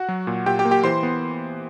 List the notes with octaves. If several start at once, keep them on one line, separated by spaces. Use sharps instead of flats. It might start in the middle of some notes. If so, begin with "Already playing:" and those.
Already playing: F#4 F#5
F#3
A#2
A#2 G4 G5
G4 G5
A#3
G4 G5
E3 C5 C6
B3